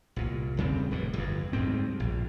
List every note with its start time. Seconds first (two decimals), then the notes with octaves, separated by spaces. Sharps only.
0.16 C2 A#2
0.57 E1 C#3 G3 C4
0.91 F1 A2
1.14 G1 F2
1.53 D2 G#2 G3 C4
2.00 A#1